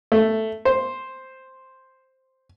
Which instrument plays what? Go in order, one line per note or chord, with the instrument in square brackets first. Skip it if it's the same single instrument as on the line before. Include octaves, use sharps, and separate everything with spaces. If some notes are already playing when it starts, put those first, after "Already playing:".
[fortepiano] A3
C5